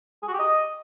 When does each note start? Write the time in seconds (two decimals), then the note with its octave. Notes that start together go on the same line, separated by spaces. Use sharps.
0.23 G#4
0.28 F#4
0.33 G4
0.39 D#5